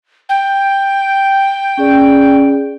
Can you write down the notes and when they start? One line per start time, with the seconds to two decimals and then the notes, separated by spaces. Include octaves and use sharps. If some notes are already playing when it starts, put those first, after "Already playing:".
0.29 G5
1.77 C#4 G#4 D5